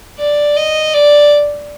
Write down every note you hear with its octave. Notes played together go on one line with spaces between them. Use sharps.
D5
D#5
D5